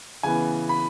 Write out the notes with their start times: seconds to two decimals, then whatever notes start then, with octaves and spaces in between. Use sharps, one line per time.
0.23 C#3 E3 B3 G#5
0.69 B5